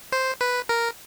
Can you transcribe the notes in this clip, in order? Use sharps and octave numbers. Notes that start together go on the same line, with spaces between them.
C5
B4
A#4